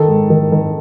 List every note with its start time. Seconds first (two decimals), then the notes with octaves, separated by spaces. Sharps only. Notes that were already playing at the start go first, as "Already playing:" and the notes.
Already playing: D#3 A4
0.08 G#2
0.30 D#3
0.52 D#3